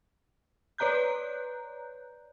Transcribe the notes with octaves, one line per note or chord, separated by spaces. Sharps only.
B4 C#5 D5 A#5 F#6 G6